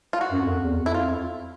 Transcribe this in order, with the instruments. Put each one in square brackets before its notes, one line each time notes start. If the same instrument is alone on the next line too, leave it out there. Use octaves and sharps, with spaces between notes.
[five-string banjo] F4
F#4
[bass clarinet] F#2
F2
E2
[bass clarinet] F2 [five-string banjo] E4
[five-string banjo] F4